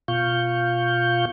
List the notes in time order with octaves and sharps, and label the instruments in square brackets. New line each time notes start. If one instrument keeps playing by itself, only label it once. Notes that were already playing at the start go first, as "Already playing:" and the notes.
[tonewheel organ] B2 F4 F5 C#6 G6